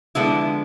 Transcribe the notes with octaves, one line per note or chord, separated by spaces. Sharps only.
D3 F3 G#3 B3 E4